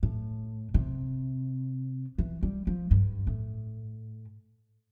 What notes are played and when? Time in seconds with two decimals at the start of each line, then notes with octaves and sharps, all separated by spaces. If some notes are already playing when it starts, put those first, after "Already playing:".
0.03 A2
0.74 C3
2.18 E3
2.43 G3
2.67 F3
2.91 G2
3.27 A2